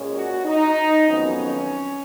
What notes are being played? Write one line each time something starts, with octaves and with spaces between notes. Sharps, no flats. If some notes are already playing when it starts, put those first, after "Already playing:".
Already playing: A#2 G#3 C#4
F#4
D#4
F2 D#3 F#3 B3 C#4